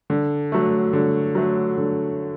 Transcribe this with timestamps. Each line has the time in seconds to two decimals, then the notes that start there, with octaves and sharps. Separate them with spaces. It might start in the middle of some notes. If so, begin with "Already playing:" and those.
0.10 D3
0.52 F#3 A3
0.93 D3
1.35 F#3 A3
1.78 D3